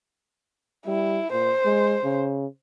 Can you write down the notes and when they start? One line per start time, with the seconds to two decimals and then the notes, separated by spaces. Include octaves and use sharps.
0.87 G3 E4
1.32 A#2 C5
1.65 G#3
2.04 C#3